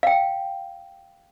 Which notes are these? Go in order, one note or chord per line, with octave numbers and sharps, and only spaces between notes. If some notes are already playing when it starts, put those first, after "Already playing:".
F5 G5